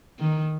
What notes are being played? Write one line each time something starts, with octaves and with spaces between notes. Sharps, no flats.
D#3